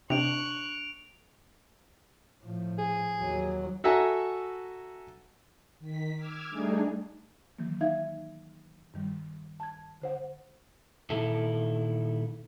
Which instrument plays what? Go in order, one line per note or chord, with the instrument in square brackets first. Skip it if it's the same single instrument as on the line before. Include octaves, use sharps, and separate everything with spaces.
[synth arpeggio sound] C3 [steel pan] D4 G5 [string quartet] C#6 F#6 [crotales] D7 F7
[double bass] A2 F3
[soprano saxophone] G#4
[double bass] D#2 F#3
[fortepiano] F#4 A4 E5 F#5 G#5 A#5
[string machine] D#3 B6
D6 E6 F6 G#6
G3 A3 D4 D#4 G#4
[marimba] D#3 E3 F#3 A#3
D#4 E5 F5 G#6
G2 D#3 G3
A5 G#6
D3 C5 F#5
[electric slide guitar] A#2 D#3 E4 A4